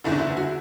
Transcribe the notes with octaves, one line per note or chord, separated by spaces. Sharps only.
F#1 E2 D3 E4
D4
E4
F#4
E4